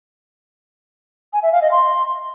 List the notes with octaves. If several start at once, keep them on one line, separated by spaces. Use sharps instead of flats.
G#5
E5
F5
D#5
C6